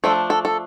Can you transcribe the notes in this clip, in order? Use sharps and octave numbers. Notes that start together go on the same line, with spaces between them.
F3 A3 D4 A4
A4
A4